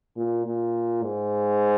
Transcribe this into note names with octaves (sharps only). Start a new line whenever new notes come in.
A#2
A#2
G#2